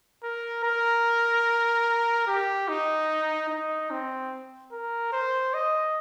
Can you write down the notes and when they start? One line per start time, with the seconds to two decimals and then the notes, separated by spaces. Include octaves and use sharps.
0.23 A#4
0.63 A#4
2.27 G4
2.68 D#4
3.49 D#4
3.90 C4
4.72 A#4
5.12 C5
5.54 D#5